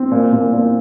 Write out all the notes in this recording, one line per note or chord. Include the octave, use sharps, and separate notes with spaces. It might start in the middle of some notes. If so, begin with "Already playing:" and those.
Already playing: C4
A#2
A#2
A#2